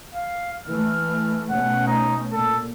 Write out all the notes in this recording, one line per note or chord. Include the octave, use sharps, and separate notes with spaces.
F5
E3 A3 F6
B2 A3 C#4 F#5
D#4
A#2 A4